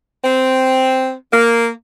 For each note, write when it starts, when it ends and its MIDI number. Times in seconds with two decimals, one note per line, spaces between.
0.24 1.12 60
1.32 1.68 58